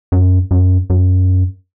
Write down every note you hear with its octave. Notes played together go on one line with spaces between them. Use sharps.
F#2
F#2
F#2